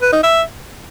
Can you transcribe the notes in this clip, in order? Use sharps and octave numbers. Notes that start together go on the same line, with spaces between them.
B4
D#4
E5